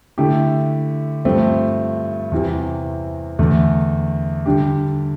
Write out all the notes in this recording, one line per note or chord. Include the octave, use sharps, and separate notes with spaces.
D3 A3 E4 G4
G2 F3 A3 C4
E2 C3 E3
E2 D3 A3 D4
D3 G3 D4 G4